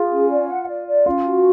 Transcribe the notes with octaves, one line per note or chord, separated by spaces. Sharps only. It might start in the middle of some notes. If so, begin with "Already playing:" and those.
Already playing: F4 G#4
C#4
D5
F#5
D5
D5
C#4 F4
F#4